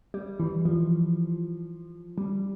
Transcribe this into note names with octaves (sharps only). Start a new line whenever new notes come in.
G3
E3
F3
G3